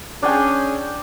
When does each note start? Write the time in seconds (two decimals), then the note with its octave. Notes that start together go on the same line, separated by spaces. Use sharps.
0.23 C#4 D4 G#4 G5